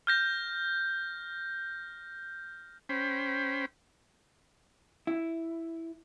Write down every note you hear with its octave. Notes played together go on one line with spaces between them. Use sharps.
F6 G6 A#6
C#4 C5 G5 B5
E4